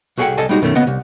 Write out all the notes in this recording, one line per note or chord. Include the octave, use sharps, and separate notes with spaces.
C2 F#4 G#4 A4 F#5 G5
C2 A4 D#5 G#5 A5
G3 G#3 D#4 F#4
F#2 B2 D#3 A3 C#4
C#3 B3 D#5
C2